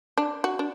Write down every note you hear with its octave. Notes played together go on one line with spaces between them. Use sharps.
D4
F#4
D4